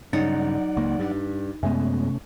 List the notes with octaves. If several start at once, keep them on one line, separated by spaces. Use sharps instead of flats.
G2 C#3 F#3 D#4 D5 F#5
C#2 A#3
G2
F#2 C3 G#3 A3 B3 C#4